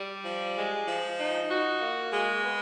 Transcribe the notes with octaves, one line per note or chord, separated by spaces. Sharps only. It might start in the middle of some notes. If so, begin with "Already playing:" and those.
Already playing: G3
F3
G#3
F3
D#4
F#4
A#3
G#3
B3